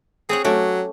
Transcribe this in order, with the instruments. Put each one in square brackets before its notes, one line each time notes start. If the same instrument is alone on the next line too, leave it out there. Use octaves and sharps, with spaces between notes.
[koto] C4 C#5 F#5 [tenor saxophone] G#4
[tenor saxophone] F#3 [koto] A3 C#4 G4